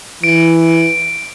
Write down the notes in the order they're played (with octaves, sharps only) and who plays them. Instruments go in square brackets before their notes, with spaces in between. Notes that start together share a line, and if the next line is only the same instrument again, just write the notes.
[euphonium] E3 [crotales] D7